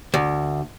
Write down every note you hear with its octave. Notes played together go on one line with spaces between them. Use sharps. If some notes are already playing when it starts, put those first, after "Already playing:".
D2